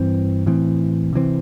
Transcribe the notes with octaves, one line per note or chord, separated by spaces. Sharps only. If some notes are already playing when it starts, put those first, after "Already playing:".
Already playing: G2 E3 C4
A2 E3 C4
C3 E3 C4